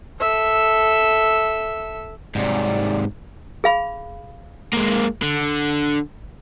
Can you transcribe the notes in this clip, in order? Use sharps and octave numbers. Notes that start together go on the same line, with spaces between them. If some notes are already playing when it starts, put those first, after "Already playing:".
A4 E5
G#2 C3 F#3 G3 D5
G#4 F5 B5
G#3 A#3
D3